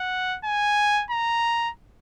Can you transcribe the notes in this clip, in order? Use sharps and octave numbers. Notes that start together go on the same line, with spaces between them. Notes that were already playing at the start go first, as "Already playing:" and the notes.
Already playing: F#5
G#5
A#5